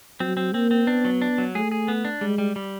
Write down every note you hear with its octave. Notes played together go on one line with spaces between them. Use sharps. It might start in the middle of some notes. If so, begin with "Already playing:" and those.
F#3 C4
C4
A#3 C4
C4
B3 D4
F#3
D4
F#3
A3 G#4
G#4
B3
D4
G3 G#3
G3
G3